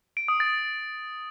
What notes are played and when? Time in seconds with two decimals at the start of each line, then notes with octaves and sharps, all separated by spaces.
0.17 D7
0.28 D#6
0.40 A6